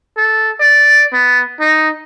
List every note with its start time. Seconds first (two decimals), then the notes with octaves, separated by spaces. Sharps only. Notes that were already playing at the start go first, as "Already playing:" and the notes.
0.17 A4
0.60 D5
1.13 B3
1.61 D#4